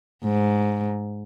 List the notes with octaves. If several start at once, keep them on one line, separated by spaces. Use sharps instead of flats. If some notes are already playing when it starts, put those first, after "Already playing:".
G#2